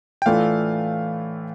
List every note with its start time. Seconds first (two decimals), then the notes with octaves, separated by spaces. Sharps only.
0.22 G5
0.26 A2 E3 A3 D4 F4 F5